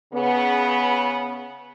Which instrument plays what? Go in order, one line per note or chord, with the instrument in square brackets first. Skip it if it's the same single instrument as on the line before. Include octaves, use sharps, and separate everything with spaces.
[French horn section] C#3 B3